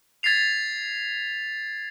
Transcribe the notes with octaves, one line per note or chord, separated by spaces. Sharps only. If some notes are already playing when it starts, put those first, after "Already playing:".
G#6 A6 B6 C7 F7